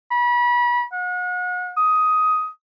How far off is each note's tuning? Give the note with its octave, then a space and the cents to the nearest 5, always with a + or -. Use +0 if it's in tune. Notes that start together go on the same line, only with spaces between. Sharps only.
B5 -35
F#5 -35
D#6 +10